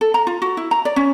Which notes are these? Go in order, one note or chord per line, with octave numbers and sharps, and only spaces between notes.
A4
A#5
F4
F#4
E4
A#5
D5
C#4